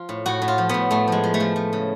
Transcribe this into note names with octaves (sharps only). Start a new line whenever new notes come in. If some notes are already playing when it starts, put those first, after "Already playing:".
Already playing: F3 F4
A2
A2 F#4
A2
F4
F3
A2 B3
A2 A3
F3 G#3
F3
A3
F3
F3
C#3